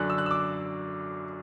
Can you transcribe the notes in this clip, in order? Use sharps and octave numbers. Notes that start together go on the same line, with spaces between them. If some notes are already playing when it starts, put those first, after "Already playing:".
Already playing: F#2 D3 F#3 F#6
E6
F#6
E6
D6